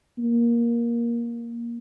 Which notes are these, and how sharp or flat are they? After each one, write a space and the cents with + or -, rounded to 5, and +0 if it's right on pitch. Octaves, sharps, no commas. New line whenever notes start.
A#3 +15